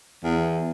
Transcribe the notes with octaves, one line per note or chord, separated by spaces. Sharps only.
E2